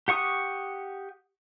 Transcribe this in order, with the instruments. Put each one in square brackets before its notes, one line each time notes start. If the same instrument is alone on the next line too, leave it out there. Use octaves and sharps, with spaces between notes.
[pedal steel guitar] G4 F#5 C#6 D#6